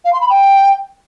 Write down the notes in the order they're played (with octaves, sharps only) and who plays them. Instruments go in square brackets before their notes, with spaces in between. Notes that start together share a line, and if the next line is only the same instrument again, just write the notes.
[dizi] F5
C6
B5
G5